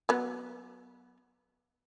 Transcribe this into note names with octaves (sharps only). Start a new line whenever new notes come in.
F#3 B3